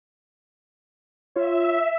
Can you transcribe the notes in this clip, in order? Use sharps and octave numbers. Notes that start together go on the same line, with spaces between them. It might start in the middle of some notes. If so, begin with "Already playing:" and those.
F4 C#5 E5